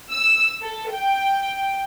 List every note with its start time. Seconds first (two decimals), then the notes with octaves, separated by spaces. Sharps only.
0.10 E6
0.61 A4
0.91 G5